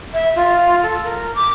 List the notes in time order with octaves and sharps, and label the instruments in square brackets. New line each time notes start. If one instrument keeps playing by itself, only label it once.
[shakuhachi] E5
F4
A4
A#4
D6